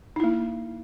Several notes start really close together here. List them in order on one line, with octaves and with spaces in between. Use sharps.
D#4 E4 A#3